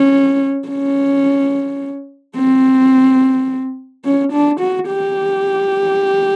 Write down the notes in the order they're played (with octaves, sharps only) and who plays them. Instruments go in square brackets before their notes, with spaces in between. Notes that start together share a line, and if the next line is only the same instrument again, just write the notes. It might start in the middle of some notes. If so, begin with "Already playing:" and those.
Already playing: [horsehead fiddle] C#4
C#4
C4
C#4
D4
F#4
G4